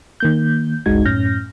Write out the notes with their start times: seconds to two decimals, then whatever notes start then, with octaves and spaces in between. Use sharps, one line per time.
0.20 D#3 A#3 G6
0.86 G1 C#2 G#3 D#4 F#4 G#6
1.05 F#2 A2 C#4 F6 G6 A#6